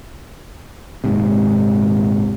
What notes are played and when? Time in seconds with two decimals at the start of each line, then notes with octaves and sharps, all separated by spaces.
1.04 D#1 G#2 C3